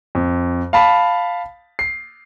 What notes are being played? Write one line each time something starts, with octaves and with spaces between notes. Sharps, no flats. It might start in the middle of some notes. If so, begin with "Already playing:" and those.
F2
F5 A5 B5
C7